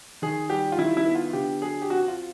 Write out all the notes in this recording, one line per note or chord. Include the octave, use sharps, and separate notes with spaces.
D#3 G#4
G3 G4
F4
D#3 E4
E4
B3
F4
D3 G4
F#3 G#4
G4
C4 F#4
F4